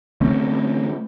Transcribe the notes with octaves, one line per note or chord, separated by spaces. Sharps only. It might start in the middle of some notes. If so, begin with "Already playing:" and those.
D3 A3 C4 C#4